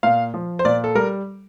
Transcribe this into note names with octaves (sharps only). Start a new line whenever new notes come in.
A#2 F5
F3
C5
A#2 D5
A4
G3 A#4